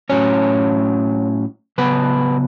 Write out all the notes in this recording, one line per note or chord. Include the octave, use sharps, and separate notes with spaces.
A2 F#3 C#4 C#5
C#3 F#3 B3 B4